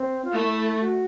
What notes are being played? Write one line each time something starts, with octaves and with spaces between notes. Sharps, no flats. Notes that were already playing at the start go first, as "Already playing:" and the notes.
Already playing: C4
F4
A3 E4
F#4